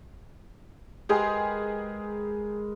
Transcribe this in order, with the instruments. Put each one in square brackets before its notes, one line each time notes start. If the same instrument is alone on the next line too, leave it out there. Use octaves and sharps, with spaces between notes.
[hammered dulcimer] G#3 A#4 B4 [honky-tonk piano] G4 G#4